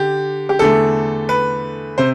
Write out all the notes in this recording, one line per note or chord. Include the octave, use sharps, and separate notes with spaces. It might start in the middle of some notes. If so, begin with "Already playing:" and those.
Already playing: D3 G4
G4
E2 D3 A3 A4
B4
C3 C5